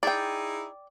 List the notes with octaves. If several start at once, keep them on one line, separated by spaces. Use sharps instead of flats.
D#4 E4 G#4 D5 G5